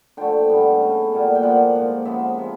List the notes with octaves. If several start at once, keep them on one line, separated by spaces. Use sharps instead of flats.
D3 F3 A3 G5
G2 E3 G3 B3
C#3 E3 A3
A#2 G3 B3
G5
A#2 F3 A#3 F#5
G#2 F3 A#3
C#3 F3 G#3 B3 E5
C3 F3 G#3